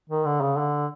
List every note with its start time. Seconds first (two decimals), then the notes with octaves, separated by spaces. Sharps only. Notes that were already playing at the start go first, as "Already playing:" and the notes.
0.10 D#3
0.25 D3
0.41 C#3
0.57 D3